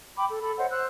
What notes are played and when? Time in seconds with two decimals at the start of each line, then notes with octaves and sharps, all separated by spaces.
0.17 G5 B5 D6
0.29 A4
0.42 A4 B5
0.58 C5 C#5 D#5 F#5
0.70 C5 E6 F#6